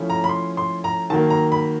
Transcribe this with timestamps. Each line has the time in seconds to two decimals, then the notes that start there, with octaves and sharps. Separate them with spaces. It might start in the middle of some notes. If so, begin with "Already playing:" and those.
Already playing: F3 A3 C#4 E4
0.10 A#5
0.24 B5
0.29 C6
0.57 C6
0.84 A#5
1.10 D#3 F#3 A#3 A5
1.30 A#5
1.52 B5